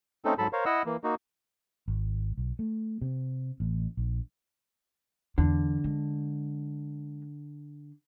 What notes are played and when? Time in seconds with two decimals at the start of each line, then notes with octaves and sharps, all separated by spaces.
0.25 A3 C4 C#4 D#4 A4
0.38 G#2 F#3 A4 A5 B5
0.53 A#4 C5 C#5 F5
0.65 E4 D#5 F#5 E6
0.86 E3 A#3
1.04 A#3 D#4 F#4
1.88 G#1
2.37 B1
2.59 A3
3.02 C3
3.60 A1
3.97 A#1
5.38 E2 D3
5.84 G#3